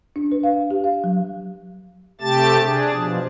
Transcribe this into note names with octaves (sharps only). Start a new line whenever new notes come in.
D4
B4
F5
G4
F5
F#3
C3 A3 G4 A5 A6
D4 G#4
B2 F3